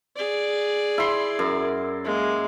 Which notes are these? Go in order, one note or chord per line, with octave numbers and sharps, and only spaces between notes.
G#4 D5
E4 C6
F#2
G#3 A#3